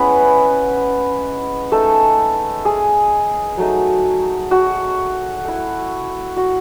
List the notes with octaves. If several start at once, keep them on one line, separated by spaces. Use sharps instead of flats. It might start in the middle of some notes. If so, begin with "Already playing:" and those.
Already playing: G#3 B3 C#4 E4 B4
G#3 A3 D#4 A4
G#4
F#3 A3 D#4
F#4
A3 E4
F#4